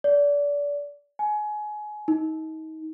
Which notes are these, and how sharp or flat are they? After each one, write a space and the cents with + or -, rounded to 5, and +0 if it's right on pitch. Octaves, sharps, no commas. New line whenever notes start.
D5 -30
G#5 +25
D#4 +30